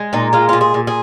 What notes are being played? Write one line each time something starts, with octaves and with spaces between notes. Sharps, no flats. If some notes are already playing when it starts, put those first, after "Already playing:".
Already playing: G#3
A#2 D#4
G#3 F4
A#2 F4
G#4
A#2
G#4